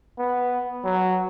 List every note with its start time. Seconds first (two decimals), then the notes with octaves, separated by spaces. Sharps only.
0.18 B3
0.84 F#3